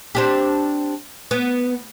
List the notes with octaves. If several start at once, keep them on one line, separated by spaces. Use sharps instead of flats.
C4 D4 G4
B3